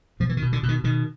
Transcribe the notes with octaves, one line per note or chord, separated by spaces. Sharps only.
B2 F3
E3
D#3
B2
D3
B2
D#3
B2 D#3